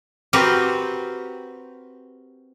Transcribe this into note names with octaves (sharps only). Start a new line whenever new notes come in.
C4 F#4 G4 A#4 B4